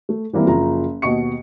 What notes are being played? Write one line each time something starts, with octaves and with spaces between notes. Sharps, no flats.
A3
E3 G3 A#3 C4 E4
F#1 F3 A#5
D#2 B2 D#5 C#6 C#7